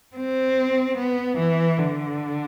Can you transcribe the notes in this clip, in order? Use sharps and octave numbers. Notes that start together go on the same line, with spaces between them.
C4
B3
E3
D3